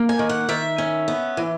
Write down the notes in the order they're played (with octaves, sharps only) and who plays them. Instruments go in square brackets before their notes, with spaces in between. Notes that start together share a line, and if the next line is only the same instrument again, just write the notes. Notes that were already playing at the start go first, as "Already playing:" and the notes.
Already playing: [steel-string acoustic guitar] A#3
G#5
D#3
F#5
D#3 E5
C#4
B3
E3